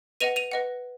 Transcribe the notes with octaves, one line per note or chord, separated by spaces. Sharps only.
B4 D#5 F#5 D#7 F7
D#7 F7
B4 D#5 F#5